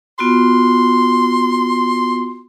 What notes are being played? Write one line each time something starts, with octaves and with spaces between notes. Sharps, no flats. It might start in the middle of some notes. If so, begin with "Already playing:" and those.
B3 F4 F#4 C6